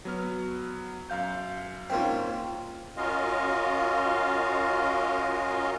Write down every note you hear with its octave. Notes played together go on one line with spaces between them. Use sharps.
F#3 B3 F6
F#2 F5 G6
G#2 A#3 C4 C#4 F4
C#4 F4 F#4 A#4 D#5 F5